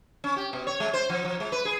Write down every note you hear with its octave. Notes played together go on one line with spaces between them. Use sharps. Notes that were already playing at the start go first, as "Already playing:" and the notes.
C#4
G4
B2
C#5
G#3
C5
F3
F3
G#3
B4
G#4